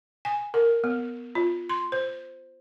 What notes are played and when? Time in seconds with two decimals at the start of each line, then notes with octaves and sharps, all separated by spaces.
0.25 G#5
0.54 A#4
0.84 B3
1.35 F4
1.69 C6
1.92 C5